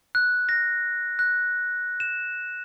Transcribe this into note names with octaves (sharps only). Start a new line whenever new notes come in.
F#6
A#6
F#6
E7